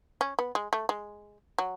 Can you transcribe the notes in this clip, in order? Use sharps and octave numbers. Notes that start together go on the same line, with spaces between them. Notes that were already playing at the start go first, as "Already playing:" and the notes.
C#4
B3
G#3
A3
G#3
F#3